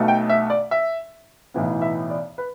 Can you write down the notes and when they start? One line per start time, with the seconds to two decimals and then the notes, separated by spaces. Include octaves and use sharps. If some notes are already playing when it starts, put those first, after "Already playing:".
Already playing: B1 B2 A3
0.08 G5
0.29 E5
0.50 D5
0.71 E5
1.54 B1 A2 E3 B3
1.82 E5
2.10 D5
2.38 B4